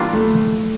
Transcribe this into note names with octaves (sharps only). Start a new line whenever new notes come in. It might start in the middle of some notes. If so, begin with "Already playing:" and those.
Already playing: E3 G3 A#3 D4 F4
A3